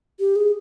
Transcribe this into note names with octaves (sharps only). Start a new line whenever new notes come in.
G4
G#4